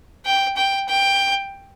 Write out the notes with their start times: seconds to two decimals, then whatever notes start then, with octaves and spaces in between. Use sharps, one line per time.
0.25 G5
0.56 G5
0.88 G5